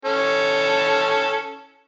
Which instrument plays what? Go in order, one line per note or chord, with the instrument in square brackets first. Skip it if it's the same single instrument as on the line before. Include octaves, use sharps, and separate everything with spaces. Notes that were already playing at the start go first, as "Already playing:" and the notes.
[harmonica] C#4 A4